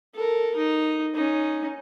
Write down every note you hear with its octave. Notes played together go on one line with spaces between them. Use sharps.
A4 A#4
D#4
C#4 D#4